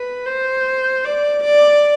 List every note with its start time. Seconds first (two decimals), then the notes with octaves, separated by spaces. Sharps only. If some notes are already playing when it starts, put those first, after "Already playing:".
Already playing: B4
0.26 C5
1.05 D5
1.44 D5